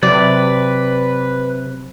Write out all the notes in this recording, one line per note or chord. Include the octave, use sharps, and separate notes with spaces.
C3 F#3 B4 D5